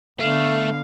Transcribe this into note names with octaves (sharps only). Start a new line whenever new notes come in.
D3 A3 B3 F5